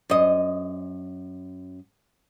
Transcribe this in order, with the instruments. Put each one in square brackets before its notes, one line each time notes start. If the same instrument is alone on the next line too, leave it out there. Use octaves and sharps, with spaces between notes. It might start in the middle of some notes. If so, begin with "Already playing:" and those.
[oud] F#2 D#5